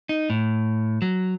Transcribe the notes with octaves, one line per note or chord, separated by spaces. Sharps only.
D#4
A2
F#3